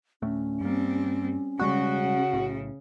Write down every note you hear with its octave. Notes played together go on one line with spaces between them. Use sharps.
D2 A2 A3 C#4
G2 G3 A#3 C4
E1 C#3 G3 G#3 F#4
B1 A2